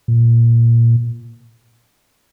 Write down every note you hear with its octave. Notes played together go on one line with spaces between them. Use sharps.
A#2